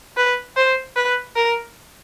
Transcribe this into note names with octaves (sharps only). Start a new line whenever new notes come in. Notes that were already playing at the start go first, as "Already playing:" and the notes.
B4
C5
B4
A#4